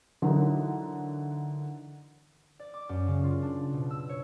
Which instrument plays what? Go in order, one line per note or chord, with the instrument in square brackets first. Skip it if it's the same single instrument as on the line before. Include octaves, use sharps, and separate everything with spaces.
[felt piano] D3 E3 F#3 D#4 A#4
[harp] D5
D6
F#2
C#3
F4
D4
B2
E6
C#5